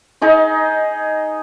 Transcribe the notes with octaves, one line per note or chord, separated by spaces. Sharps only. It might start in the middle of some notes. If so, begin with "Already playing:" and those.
D#4 G#4 D#5